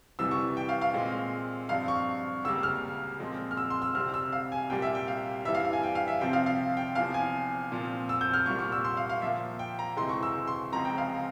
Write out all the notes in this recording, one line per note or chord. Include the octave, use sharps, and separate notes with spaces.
C2 C3 E3 G3 E6
C#6
G5
F5
F5
A#2 G#3 C4
G2 F3 C4 F5
C#6
C#2 C#3 G3 A#3 E6
F6
A#2 F3 G#3 C4
F6
E6
C6
E6
C2 C3 G3 C4 F6
E6
F5
G#5
C2 A#2 G3 A#3 G5
E5
G5
F5
G2 E3 G3 E5
F5
F5
G#5
G5
F5
E5
C2 C3 F3 C4 G5
F5
F5
G5
E2 C3 F3 F5
G#5
A#2 F3 C4
E6
G6
F6
C2 A#2 G3 C#6
C#6
E6
C6
F5
F5
A#2 F3 A#3 E5
G5
A#5
C#2 C3 E3 G#3 C4 C6
C#6
E6
C6
C#2 C#3 F3 G#3 C4 A#5
G5
F5